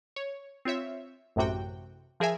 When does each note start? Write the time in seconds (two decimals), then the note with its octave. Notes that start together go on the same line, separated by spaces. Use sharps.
0.16 C#5
0.65 C4 F4 C#5 E5
1.36 A1 F#2 A2 C3 F#4 G5
2.20 F3 G#4 A#4 E5 G#5